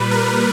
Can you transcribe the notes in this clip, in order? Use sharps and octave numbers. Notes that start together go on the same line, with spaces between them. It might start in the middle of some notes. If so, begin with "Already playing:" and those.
Already playing: A#2 G3 B4
A#4